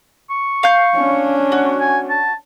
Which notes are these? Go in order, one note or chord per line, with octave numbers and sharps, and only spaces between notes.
C#6
F5 G6
C#4 D4
F#4
G#5
A5